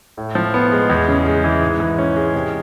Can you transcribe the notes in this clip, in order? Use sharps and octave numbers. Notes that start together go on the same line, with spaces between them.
A2
F3
B3
G#3
E2
C#3
G#3
E3
G#2
E3
C#4
G#3
C3